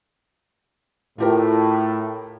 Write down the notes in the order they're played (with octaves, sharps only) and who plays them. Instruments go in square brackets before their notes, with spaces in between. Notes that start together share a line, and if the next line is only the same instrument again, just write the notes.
[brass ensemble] A2 [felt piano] F4 G4 A#4